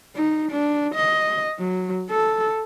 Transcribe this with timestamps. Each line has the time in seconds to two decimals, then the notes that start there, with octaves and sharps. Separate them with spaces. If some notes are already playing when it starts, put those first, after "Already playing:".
0.16 D#4
0.52 D4
0.95 D#5
1.60 F#3
2.11 A4